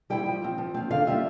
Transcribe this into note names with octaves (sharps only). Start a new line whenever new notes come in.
G3 C4 E4 G5
F3
C4 F4
F3
C4 F4
D3 F5
G3 C4 F4 E5